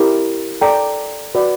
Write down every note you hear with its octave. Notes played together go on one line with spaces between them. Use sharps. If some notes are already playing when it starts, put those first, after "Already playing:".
Already playing: E4 G4 A#4
A4 D5 G5 A#5
F#4 B4 D5